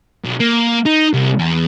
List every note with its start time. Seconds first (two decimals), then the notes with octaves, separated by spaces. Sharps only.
0.25 B1
0.40 A#3
0.86 D#4
1.13 C2
1.39 E2